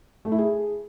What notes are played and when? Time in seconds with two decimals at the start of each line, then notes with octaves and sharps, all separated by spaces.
0.25 A3
0.32 E4
0.38 G#4